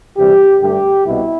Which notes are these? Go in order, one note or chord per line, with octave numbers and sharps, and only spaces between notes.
D2 C3 E3 G3 G4
G2 D3 A3 G4
C2 B2 E4